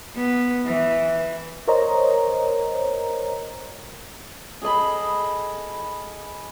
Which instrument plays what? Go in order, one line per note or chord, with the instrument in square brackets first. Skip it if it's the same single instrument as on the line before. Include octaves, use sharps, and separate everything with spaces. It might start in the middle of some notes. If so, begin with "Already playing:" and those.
[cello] B3
E3
[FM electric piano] A#4 C5 C#5 D#5 A#5
[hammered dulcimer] G#4 A4 D#5 B5